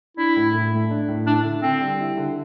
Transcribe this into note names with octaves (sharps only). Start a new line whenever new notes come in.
D4 E4
A2
A2
A3
D4
A2
D4 E4
D3
D3 C4
G3
E4
D3